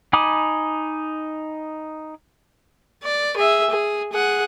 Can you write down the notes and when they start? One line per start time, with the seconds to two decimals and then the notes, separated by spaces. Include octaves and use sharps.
0.13 D#4 G#5 B5 D6 D#6
3.04 D5
3.37 G#4 E5
3.70 G#4
4.13 G#4 F#5